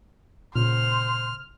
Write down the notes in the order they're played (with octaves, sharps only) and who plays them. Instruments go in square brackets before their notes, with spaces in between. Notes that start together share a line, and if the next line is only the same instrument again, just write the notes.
[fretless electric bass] A#2 C#3 [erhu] C5 [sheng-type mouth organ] F6